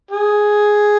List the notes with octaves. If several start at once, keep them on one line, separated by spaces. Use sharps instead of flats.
G#4